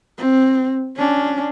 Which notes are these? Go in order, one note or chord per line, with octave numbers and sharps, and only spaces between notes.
C4
C#4 D4